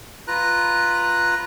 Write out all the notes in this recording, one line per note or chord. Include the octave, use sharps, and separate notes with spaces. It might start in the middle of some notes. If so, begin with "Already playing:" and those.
F4 B4 A#5 F#6